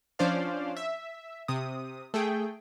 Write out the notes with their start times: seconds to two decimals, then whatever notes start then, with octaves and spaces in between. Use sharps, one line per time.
0.19 F3 C#4 D4 C5 D5 F5
0.77 E5
1.48 C3 D#6
2.14 A3 G#4 G5